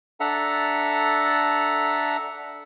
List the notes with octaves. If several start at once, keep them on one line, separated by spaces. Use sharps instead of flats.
D4 A4 E5 F#5 A#5